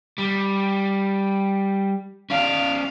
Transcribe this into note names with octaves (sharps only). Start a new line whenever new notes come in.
G3
C#4 D5 F5